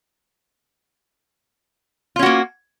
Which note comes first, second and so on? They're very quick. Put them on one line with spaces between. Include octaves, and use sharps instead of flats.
F4 C#4 F#4 A#3